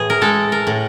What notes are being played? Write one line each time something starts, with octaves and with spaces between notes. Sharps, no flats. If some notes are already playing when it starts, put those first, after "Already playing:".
Already playing: A2 E3 G#4
A#4
G#3 A4
A#4
A2